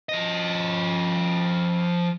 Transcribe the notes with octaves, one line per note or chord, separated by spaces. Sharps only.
F3 D#5